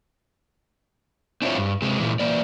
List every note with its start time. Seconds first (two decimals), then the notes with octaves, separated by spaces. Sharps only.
1.42 C4 D4 E4 F4 B4 C#5
1.57 G2
1.82 C3 G#3
2.00 A#2 E3
2.19 E3 A#3 D5